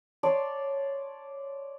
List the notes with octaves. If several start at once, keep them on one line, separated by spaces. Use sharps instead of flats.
C#5 D5 A5 C6